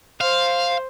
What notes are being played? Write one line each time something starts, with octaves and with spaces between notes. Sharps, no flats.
C5 F5